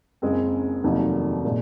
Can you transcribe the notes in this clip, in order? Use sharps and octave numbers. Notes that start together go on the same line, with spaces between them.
F#1 F#2 C#3 G#3 C4
F1 D#2 D#3 F#3
A#2 G#3